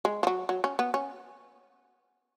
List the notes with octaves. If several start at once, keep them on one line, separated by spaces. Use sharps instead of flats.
G#3
F3
F#3
F#3
C#4
B3
C#4